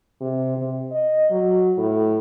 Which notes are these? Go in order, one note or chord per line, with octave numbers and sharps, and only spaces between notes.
C3
C3
D#5
F#3
A2